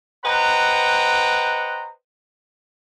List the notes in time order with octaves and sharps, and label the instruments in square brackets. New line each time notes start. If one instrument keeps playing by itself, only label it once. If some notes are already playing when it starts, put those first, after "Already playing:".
[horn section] B4 C5 D#5 F#5 G5 A#5